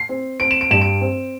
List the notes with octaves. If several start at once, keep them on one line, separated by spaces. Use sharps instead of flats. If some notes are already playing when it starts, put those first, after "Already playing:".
Already playing: C7
C4
C4 D7
E7
D7
G2 E7
D7
C4